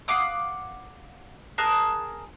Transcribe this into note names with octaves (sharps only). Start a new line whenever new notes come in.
F5 F#5 D6 D#6
G#4 A#4 A5 F#6